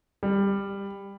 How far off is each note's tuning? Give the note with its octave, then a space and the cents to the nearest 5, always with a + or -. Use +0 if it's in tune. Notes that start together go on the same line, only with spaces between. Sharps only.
G3 +15